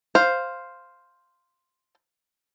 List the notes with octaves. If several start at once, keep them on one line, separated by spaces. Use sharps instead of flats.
C5 F5